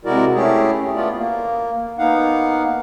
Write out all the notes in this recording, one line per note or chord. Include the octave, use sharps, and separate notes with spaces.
C3 G#3 E4 F#4 A#4 D5
A3 C#4 E4 G4 G#4
A3 B3 F4 D5
A#3
A#3 B3 D#4 F5 F#5